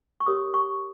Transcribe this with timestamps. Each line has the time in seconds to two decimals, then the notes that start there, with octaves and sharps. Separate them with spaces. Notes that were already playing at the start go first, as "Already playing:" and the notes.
0.20 C#6
0.26 G4 A#4 C#5 D#6
0.54 C#6